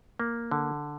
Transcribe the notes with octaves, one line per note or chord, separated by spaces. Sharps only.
A#3
D3